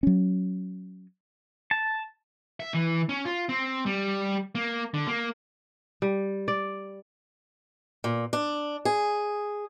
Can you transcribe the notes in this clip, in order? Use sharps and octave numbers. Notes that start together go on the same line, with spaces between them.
F#3 C#4
A5
E5
E3
C#4
F4
C4
G3
A#3
D3
A#3
G3
D5
A#2
D4
G#4